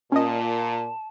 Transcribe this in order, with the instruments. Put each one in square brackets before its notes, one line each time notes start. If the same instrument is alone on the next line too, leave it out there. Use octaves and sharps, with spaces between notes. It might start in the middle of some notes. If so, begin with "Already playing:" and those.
[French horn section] A#2 [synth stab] C#4 D#5 [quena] A5